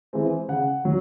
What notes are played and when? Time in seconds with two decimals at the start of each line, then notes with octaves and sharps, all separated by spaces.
0.13 E3 G#3 C4
0.48 C#3 F#5
0.85 F#3